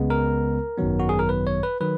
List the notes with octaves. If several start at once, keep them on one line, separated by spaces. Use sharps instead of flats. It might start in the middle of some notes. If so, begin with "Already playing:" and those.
Already playing: C#2 C#3 G#3 B3
A#4
G#1 F#2 D#3 F#3 B3
F#4
G#4
A#4
B4
C#5
B4
D#3 F#3 B4